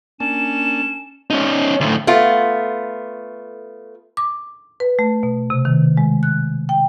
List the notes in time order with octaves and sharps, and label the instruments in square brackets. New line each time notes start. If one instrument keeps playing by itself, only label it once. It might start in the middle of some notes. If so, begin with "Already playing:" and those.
[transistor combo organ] A#3 D4 A5 [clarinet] C#4 [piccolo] E7
[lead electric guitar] C#4 D#4
D2 A2
[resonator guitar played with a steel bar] A3 B3 F4
[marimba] D6
B4
A3
B2
C3
D#3
G#3
F#6
G5